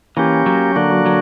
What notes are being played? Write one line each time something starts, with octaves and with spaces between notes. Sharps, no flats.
E3 A#3 C#4 G4
F#3
D3 A#3 D4 F#4
F#3